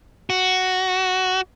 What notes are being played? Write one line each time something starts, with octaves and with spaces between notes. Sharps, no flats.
F#4